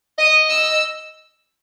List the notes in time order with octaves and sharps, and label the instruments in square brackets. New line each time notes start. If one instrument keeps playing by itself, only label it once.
[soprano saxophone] D#5 [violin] D#6
[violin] E6